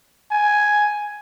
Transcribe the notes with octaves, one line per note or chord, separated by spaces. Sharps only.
G#5